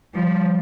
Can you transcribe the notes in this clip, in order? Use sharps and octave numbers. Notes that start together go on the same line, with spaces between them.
F3 G3